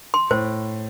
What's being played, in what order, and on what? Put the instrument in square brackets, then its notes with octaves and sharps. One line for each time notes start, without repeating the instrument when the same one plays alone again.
[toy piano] C6
[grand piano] A2 [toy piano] C5